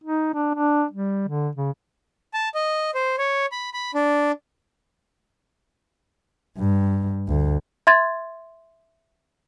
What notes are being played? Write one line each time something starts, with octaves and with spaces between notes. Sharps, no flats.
D#4
D4
D4
G3
D3
C#3
A5
D#5
C5
C#5
B5
B5
D4
G2
D2
E5 C6 G#6 A6